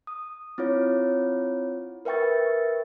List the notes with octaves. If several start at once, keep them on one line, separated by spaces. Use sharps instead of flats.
D#6
C4 E4 F4 C#5
A#4 B4 E5 G5 C#6 A6